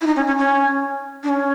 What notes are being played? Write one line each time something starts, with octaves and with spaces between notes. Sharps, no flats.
E4
D#4
C#4
C#4
C#4
D4
C#4